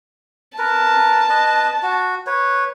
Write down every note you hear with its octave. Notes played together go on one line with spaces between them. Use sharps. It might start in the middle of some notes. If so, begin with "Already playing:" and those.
A#4 B4 A5
B4 D#5
F#4
B4 C#5